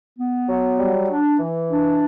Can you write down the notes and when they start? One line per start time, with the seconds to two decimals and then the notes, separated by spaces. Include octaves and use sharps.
0.19 B3
0.49 F#3
0.79 G3
1.09 D4
1.39 E3
1.70 D4